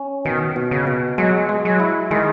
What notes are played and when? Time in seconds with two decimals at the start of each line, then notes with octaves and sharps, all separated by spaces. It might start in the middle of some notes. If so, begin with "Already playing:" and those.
Already playing: C#4
0.25 B2 D#3
0.56 B2
0.71 C#3
0.87 B2
1.18 F#3 G#3
1.49 G#3
1.65 F#3
1.80 E4
2.11 D#3 G#3